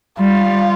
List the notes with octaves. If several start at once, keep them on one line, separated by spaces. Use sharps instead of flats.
G3 F4